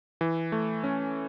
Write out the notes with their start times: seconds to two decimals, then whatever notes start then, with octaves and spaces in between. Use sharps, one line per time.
0.21 E3
0.52 A3
0.84 C#4